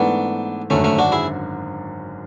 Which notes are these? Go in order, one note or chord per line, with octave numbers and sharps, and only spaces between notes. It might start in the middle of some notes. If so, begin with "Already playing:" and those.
Already playing: G#2 E3 A3 B3 D4
G#1 F#2 D3 A3 C#4
A3 C#4
D4 F#4
E4 G#4